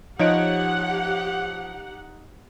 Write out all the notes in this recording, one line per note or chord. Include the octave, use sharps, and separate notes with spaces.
F3 D#4 G4 C#5 F#5 D7